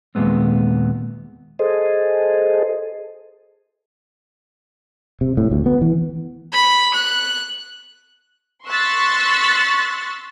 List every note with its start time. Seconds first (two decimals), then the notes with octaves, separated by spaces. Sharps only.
0.15 D#2 A#2 D#3 G#3 B3 C4
1.59 G#4 A4 C5 D#5
5.21 C3
5.37 A2
5.51 D2
5.66 B3
5.81 E3
6.53 B5
6.94 F#6
8.66 C6 C#6 E6 F#6 A6 B6